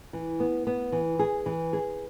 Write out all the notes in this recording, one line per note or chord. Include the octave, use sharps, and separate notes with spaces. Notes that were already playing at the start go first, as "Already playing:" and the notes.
E3
B3
B3
E3
G#4
E3
G#4